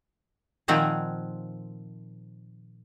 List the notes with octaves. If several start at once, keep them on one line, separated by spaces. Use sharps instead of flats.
A#2 D#3 F3 C4 F#5 G#5